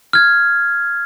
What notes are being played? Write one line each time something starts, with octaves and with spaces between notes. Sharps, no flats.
F6 G#6